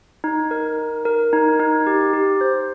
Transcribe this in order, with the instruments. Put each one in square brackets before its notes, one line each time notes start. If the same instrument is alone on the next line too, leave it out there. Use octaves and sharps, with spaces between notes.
[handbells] D#4
A#4
D#4
A#4
D#4
D#4
G4
G4
C5